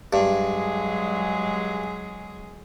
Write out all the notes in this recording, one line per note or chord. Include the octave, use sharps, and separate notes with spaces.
G2 F#3 G#3 G#4